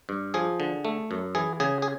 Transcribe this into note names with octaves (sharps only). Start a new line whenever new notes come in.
G2
F3 G#4
D3
A3
F#2
E3 G#4
C#3 G#4
G#4